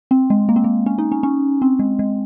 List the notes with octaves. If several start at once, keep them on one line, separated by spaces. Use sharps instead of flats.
C4
G#3
A#3
C4
A#3
C#4
D#4
C#4
C#4
C4
G#3
G#3